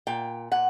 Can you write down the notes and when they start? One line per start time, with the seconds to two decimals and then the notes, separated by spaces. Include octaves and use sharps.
0.07 A#2 G5
0.51 A#2 F#5